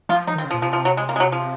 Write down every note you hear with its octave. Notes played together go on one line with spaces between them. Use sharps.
F3 F4
F3 D#4
D#3 C4
C#3
F3
A#2
C3 F3
F3
F#3
G#3
A#3
G#3
F#3
F3